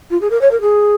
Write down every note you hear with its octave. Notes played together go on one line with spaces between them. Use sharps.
F4
G#4
A#4
C#5
A#4
G#4